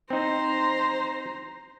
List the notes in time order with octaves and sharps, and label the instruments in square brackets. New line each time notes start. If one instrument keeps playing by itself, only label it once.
[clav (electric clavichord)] C4 D#4 [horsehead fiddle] C5 A#5